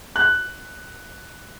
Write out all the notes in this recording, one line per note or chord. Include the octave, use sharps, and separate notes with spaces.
F#6